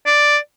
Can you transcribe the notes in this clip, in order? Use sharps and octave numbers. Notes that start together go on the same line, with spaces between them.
D5